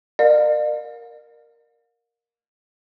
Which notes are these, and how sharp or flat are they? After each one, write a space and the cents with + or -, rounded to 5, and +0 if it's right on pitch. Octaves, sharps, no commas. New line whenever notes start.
A#4 +0 D5 +45 F5 +30